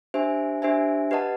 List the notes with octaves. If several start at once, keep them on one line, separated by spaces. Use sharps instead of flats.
D4 G4 C5 E5 G#5
D4 G4 C5 E5 G#5
G4 B4 D#5 F#5 A5